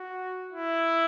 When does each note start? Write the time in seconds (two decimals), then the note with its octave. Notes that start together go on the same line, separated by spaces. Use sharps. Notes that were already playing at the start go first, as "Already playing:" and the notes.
Already playing: F#4
0.53 E4